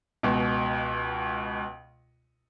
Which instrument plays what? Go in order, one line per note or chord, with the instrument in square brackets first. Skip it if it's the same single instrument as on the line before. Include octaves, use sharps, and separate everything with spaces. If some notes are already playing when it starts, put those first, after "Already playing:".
[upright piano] C#2 B2